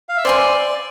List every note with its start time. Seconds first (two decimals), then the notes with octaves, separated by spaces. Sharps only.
0.09 F5
0.17 E5
0.24 C5 D5 G#5 C6